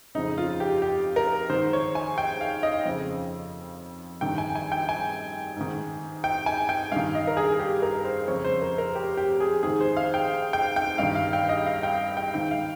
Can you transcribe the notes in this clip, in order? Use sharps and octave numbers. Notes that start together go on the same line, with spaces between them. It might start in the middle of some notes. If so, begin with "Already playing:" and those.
F2 C#3 D#4
F4
G4
G4
A#4
G#2 D#3 C5
C#5
G#5
G5
F5
D#5
F2 C#3
G2 D#3 G5
G#5
G#5
G5
G#5
G#2 D#3
G5
G#5
G5
G2 D#3 F5
D#5
A#4
G#4
G#4
G4
A#4
C5
F2 C#3 C#5
C5
A#4
A#4
G4
G4
G#4
G#2 D#3 G#4
C5
F5
G5
G5
G5
G2 D#3 F5
F5
G5
D#5
F5
G5
G5
G#2 D#3 G5
F5